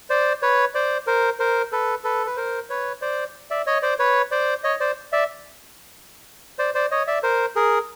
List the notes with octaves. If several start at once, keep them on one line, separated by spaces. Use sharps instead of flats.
C5 D5
B4 C#5
C5 D5
A#4 C5
A#4 C5
A4 B4
A4 B4
B4
A#4 C5
B4 C#5
C5 D5
D5 E5
C#5 D#5
C5 D5
B4 C#5
C5 D5
C#5 D#5
C5 D5
D5 E5
C5 D5
C5 D5
C#5 D#5
D5 E5
A#4 C5
G#4 A#4